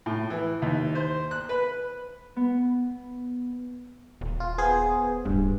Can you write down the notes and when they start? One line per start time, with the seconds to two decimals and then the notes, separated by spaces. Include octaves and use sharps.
0.06 A2
0.30 E3
0.62 D#2
0.95 C5
1.31 F#6
1.49 B4
2.36 B3
4.21 D#1
4.40 F4
4.58 B3 G#4 C5
5.25 D1 G2